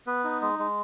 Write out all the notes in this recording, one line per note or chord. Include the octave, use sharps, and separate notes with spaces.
B3 B4
D#4
G#3
G#3